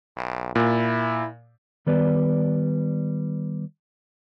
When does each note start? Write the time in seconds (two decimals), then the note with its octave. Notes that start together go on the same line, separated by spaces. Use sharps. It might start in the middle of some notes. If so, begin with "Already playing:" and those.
0.17 B1
0.55 A#2 E4
1.87 D#3 G3 B3 B4 D5